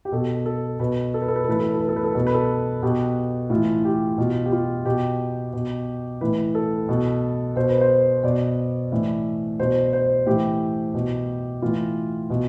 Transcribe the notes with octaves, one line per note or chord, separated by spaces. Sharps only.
G4
B2 A4
A4
B2 B4
A4
B4
A4
B4
A4
A2 E3 B4
A4
B4
A4
B4
A4
B4
A4
B4
B2 A4
B4
A4
B2 G4
A2 F4
E3
G4
B2 F4
G4
F4
B2 G4
B2
A2 E3 B4
A4
B2
B2 C5
B4
C5
B2 D5
A2 E3
B2 C5
C5
A2 E3 G4
B2
A2 E3 F4
B2